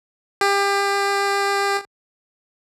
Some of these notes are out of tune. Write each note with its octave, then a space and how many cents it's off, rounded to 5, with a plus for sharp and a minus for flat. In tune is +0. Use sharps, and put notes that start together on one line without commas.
G4 +30